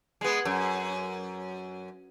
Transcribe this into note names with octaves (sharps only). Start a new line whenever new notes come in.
G#3 B3
F#2